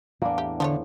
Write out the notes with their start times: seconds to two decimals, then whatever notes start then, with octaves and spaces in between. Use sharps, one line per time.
0.22 E2 A2 E3 A#3 D4
0.38 G4
0.60 D3 F3 A3 C#5